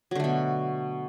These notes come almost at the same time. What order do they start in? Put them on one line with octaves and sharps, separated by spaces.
F#3 D3 A3 B2